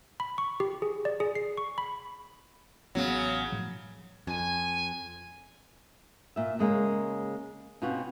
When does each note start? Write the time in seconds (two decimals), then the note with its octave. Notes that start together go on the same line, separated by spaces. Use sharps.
0.20 B5
0.38 C#6
0.60 G4
0.82 G#4
1.05 D5
1.20 G#4
1.35 C7
1.57 C#6
1.78 B5
2.95 A1 C#3 F#3 B3 C#4
3.52 A2 F3 F#3
4.27 F2 G#5
6.36 A#2 E5
6.59 C#3 G#3 A#3 C#4
7.82 B2 C4 C#4 F4 F#4